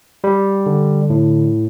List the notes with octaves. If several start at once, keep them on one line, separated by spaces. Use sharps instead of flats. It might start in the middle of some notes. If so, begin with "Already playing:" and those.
G3
D3
A2